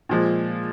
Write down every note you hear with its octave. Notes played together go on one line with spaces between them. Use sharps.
A#2 F3 G#3